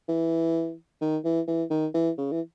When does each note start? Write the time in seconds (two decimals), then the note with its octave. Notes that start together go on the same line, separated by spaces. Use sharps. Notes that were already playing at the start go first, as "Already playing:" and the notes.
0.08 E3
1.01 D#3
1.24 E3
1.47 E3
1.70 D#3
1.94 E3
2.18 C#3
2.32 E3